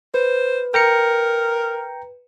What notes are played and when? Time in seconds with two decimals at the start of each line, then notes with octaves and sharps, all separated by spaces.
0.14 B4 C5
0.74 A#4 G5 A#5 C#7